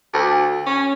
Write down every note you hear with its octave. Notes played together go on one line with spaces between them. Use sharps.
D2
C#4